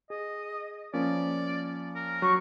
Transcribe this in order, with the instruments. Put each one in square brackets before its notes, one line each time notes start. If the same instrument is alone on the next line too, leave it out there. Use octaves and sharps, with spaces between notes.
[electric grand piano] G#4 [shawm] D#5
[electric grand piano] F3 A#3 C#4 [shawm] D5
[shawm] A#4
[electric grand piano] F#3 [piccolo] C#6